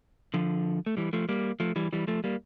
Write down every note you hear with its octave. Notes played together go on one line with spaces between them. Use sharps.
D3 F3
A3
E3 G3
F3 A3
G3 A#3
F3 A3
E3 G3
E3 G3
F3 A3
G3 A#3